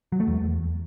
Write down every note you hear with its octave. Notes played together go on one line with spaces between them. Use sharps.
F#3
A3
E2